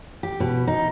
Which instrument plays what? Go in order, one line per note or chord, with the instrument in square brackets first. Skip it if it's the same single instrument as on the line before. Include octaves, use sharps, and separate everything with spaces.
[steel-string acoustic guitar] G4
B2
D#4